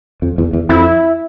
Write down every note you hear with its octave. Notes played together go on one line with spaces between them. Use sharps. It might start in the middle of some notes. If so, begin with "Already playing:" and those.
F2
E2
E2
F2 E4